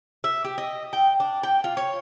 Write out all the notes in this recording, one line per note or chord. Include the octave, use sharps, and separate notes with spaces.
E5
G4
D#5
G5
D4
G5
F4
C#5